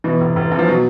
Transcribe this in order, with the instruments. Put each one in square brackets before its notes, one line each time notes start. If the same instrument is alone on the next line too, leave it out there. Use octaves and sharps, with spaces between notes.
[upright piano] B2 [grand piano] E3
[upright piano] F1
F1
E2
[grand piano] F3
[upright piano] B2 [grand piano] F#3